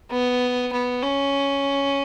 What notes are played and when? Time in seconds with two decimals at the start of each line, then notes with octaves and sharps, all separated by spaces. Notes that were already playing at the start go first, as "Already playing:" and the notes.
0.11 B3
0.73 B3
1.02 C#4